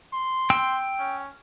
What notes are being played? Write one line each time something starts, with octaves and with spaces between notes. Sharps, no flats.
C6
G5 E6
C#4